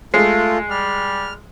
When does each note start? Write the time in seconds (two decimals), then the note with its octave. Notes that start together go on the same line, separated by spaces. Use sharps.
0.14 G#3 A3 F4 C7
0.70 G3 F6